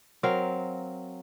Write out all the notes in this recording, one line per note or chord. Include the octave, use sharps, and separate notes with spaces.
F#3 C4 A#4 F5